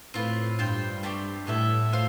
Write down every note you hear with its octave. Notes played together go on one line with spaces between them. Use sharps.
A2 C4 F4 B4
G2 F4 C5 G5
A3 C4 G4 D5
A2 B3 E4 A4 E5
F4 C5 F5